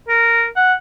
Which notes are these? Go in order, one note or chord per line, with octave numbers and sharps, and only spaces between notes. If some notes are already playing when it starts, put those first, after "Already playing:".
A#4
F#5